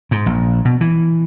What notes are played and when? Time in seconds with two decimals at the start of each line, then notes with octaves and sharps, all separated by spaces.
0.11 G#2
0.26 A#1
0.65 B2
0.81 E3